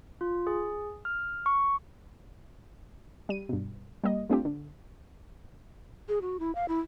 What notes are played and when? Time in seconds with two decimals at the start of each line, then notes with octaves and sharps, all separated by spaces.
0.21 F4
0.47 G#4
1.05 F6
1.46 C#6
3.29 G3 D#7
3.49 G2 B2
4.04 G3 A#3 D#5
4.30 G3 A3 C4 D4 F4 G4
4.45 D3
6.09 G#4
6.22 F#4
6.40 E4
6.55 F5
6.68 E4